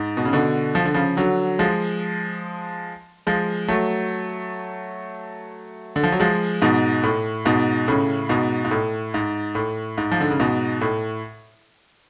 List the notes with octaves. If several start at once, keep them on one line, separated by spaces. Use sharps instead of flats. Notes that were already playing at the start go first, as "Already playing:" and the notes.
Already playing: G#2
B2
C#3
B2 D3
F3
D3
C#3 F3
D3 F#3
F3 G#3
F3 G#3
F#3 A3
D3
F3
F#3
F3 G#3
G#2 B2
A2
G#2 B2
A2 C#3
G#2 B2
G#2
A2
G#2
A2
G#2
F3
D3
C#3
G#2 B2
A2